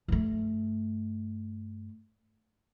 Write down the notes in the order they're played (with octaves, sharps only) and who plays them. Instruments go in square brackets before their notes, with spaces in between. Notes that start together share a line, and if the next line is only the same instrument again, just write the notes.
[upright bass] G2 A3